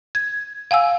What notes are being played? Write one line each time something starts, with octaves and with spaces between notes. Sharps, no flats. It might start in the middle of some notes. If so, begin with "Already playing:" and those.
G#6
F5 F#5 G#5 E6